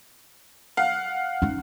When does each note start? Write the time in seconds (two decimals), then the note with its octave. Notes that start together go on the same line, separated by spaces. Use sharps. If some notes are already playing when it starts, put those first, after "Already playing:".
0.77 F5 F#5
1.42 C#4 D#4